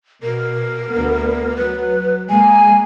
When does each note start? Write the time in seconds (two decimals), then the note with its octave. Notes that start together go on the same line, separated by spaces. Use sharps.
0.23 B2 A#4
0.91 D2 B3
1.56 F#3 B4
2.30 G#3 A#3 G#5